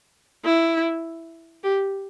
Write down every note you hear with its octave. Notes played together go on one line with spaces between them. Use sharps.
E4
G4